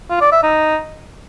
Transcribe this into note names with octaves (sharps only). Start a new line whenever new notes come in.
F4
D5
E5
D#4